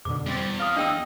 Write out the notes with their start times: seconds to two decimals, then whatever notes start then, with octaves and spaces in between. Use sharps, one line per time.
0.05 F2 B2 D3 D6
0.26 E2 G3 C4 A6
0.60 F5 C6 D#6
0.76 D4 D#5 G5 E6